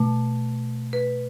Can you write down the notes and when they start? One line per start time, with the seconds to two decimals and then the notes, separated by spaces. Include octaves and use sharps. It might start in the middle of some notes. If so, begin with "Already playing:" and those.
Already playing: B2 A3
0.93 B4